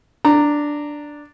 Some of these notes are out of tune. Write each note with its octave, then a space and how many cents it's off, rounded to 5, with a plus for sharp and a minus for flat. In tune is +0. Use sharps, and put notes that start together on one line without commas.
D4 +0 A#5 -15